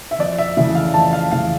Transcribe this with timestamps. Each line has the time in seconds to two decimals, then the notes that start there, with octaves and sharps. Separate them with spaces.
0.11 E5
0.19 F2 D5
0.38 E5
0.57 C#3 E3 A3 E5
0.75 F5
0.94 F2 A5
1.13 F5
1.31 C#3 E3 A3 F5